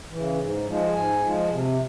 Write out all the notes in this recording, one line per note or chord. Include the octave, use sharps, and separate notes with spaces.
C#3 E3
G#2
F3 G#3
G#2 G#5
F3 G#3
C3